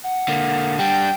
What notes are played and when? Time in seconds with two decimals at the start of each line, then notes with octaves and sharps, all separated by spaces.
0.03 F#5
0.28 D3 A#3
0.79 G3 D4 G5